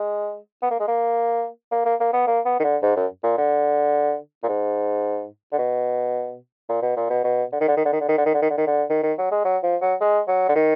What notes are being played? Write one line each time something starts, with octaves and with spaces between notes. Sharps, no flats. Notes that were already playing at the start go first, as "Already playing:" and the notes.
Already playing: G#3
B3
A#3
G#3
A#3
A#3
A#3
A#3
B3
A#3
B3
D#3
D3
G#2
F#2
A#2
D3
A#2
G#2
D3
B2
A#2
B2
A#2
B2
B2
D3
D#3
D3
D#3
D3
D#3
D3
D#3
D3
D#3
D3
D#3
D3
D#3
D3
D#3
D#3
F#3
G#3
F#3
F3
F#3
G#3
F#3
D3
D#3